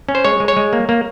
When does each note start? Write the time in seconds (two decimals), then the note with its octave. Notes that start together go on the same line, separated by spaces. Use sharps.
0.09 C#4
0.15 C5
0.25 G#3 C#5
0.40 G#3
0.48 C#5
0.56 G#3
0.73 A#3
0.89 A#3